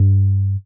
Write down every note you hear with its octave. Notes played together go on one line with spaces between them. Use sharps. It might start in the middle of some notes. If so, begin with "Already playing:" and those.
Already playing: G2